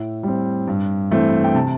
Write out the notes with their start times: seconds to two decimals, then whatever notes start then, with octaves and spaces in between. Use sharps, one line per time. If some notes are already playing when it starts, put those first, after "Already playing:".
Already playing: A2 E5
0.23 G3 C4
0.68 G2
1.11 E3 A3 C4
1.44 G5
1.54 C3 A5